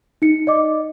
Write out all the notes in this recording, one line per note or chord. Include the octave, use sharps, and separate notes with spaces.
D#4 C#7
D5 D#5 D6